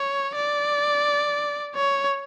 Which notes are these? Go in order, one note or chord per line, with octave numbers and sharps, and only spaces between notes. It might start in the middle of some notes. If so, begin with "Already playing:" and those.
Already playing: C#5
D5
C#5